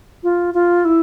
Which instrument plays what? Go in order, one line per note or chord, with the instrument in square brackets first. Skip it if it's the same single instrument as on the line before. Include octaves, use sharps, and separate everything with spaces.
[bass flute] F4
F4
E4